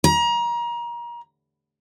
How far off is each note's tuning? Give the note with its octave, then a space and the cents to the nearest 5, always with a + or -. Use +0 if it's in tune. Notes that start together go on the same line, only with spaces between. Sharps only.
A#5 +30